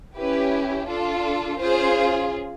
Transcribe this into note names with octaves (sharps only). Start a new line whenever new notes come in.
C#4 E4 G4 B4
D4 F4 A4
C#4 F4 G#4 C5